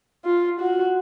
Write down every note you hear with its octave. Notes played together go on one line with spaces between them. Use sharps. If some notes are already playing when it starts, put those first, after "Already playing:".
F4
F#4